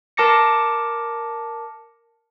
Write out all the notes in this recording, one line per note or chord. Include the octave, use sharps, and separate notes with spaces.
A#4 A5 D6 A#6 C#7